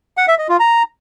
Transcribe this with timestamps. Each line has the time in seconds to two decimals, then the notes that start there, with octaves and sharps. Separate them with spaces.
0.17 F#5
0.28 E5
0.39 D#5
0.49 F4
0.60 A#5